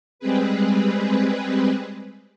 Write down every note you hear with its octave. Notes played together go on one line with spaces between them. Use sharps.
G3 G#3 C4 G#4 B4